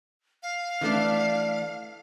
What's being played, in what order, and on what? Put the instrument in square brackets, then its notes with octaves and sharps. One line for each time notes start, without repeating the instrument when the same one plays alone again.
[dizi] F5
[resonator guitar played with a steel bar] E3 A3 D4